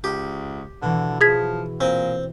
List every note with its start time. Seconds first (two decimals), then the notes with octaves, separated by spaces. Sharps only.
0.04 C#2 G4
0.82 B2 D3 E3
1.21 F3 G#4 G#6 B6
1.81 A#2 C4